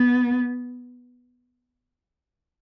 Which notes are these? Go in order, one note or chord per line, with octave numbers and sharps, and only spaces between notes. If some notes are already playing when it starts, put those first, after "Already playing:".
Already playing: B3